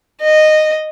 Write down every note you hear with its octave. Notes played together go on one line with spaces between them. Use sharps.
D#5